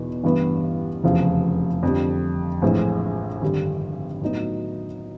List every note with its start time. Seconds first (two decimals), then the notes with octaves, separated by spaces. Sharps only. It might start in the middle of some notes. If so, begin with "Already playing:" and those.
Already playing: E2 B2 B3 D#4
0.24 A1 G2 E3 G3 B3
1.04 F1 E2 C#3 F3
1.83 F2 D3 G3
2.62 A#1 A2 E3 G#3 C4
3.42 G#1 G2 D3 G3
4.21 A2 F#3 B3 D#4 F#4